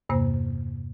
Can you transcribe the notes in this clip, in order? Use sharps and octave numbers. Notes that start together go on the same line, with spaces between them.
E2 G2 C3 A#3 C5